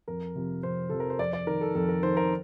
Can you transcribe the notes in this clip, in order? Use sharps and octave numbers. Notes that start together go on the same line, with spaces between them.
F2 A#4
C3 F3
F2 C5
C3 F3 A4
A#4
C5
F2 D5
D5
D#3 A#4
A4
F2 A4
A#4
D#3 C5
A#4